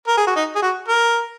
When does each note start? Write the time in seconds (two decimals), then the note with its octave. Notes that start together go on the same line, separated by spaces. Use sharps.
0.07 A#4
0.17 G#4
0.27 F#4
0.36 D#4
0.56 G#4
0.62 F#4
0.88 A#4